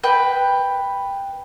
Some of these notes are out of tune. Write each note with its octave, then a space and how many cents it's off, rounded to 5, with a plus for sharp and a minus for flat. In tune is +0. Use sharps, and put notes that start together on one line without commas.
B4 +0 G5 +10